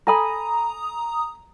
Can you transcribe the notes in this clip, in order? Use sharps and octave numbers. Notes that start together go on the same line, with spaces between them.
A4 G#5 A#5 B5 D#6